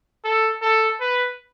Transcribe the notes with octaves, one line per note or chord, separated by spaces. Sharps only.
A4
A4
B4